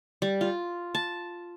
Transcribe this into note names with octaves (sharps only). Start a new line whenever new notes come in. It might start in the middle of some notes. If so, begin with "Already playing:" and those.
G3
F4
A5